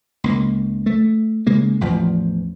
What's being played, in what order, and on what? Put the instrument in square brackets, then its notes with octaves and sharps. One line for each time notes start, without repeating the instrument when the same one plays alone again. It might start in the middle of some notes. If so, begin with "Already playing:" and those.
[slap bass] C#2 A#3
A3
C#3 G#3 A#3
A1 E2 F3